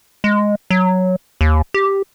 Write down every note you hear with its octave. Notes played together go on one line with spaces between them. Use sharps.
G#3
F#3
D#2
G4